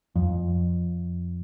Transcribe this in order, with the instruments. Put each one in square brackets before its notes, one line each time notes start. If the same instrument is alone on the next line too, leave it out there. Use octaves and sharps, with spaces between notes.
[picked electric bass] F2